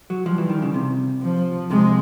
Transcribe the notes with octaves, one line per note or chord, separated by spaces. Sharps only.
F#3
F3 G3
E3
D#3
C#3
C3
F3
C3 G#3